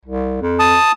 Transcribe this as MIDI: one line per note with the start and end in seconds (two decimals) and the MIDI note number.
0.05 0.38 36
0.42 0.76 41
0.59 0.92 81
0.59 0.92 87